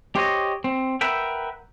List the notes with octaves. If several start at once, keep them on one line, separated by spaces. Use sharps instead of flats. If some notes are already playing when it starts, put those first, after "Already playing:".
G4 C5 C#5 D#5
C4
A#4 B4 E5 F#5 G5